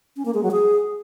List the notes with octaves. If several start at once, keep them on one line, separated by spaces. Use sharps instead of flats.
C#4
A#3
G#3
F#3
G#4